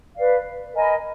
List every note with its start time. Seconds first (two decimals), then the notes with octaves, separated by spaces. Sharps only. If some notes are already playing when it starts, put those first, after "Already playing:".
0.15 B4 D5 F5
0.73 A#4 D#5 G#5 B5